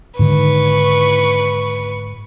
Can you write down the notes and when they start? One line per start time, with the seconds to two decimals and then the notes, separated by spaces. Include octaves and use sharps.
0.19 G#2 D3 D#3 B4 C#6